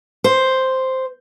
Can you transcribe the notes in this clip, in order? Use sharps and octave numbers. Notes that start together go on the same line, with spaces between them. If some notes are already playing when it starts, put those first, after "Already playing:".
C5